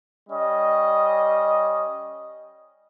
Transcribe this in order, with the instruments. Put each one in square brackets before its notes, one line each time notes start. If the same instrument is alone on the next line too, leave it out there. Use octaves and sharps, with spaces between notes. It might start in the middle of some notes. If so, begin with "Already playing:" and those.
[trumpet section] G3 C#4 D#5